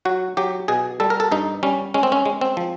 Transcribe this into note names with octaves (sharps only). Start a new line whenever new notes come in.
F#3 F#4
F#3 G4
B2 G#4
G3 A4
A#4
A4
G2 D#4
G3 C#4
G#3 C#4
C4
C#4
G#3
C4
F3